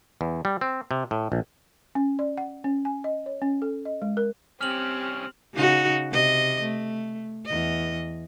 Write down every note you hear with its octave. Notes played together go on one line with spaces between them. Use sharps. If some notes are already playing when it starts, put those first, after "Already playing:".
E2
G3
C4
C3
A2
A#1
C#4
D5
F#5
C#4
G#5
D#5
C#5
C#4
A4
D#5
G#3
A#4
C2 C4 C#4 G4 F6 F7 F#7
C#3 D#4 F#4
C3 D#5
A3
E2 D#5